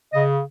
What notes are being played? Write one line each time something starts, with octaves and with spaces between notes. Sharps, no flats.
C#3 D#5